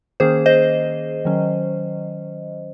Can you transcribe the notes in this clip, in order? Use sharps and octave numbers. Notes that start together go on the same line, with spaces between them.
D#3 A#3 C#4 G#4 C5
C5 D#5
D#3 F#3 C#4